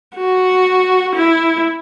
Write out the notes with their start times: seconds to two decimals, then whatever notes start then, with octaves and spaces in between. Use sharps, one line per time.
0.17 F#4
1.15 E4